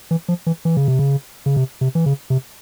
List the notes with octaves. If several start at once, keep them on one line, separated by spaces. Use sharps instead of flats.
E3
F3
E3
E3
C#3
C3
C#3
C#3
C3
C3
E3
C#3
C3